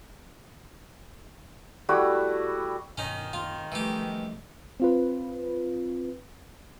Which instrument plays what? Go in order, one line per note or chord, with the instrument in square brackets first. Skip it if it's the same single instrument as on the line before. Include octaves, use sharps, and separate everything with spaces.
[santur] G3 A3 E4 F#4
[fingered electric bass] G2 B2 [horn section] D#3 [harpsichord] C#4 D#4
[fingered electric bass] F#2 C3 A#3 [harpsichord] F4
[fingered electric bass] C3 F3 G3 [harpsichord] E3 G4 [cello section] A3
[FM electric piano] C4 F4 B4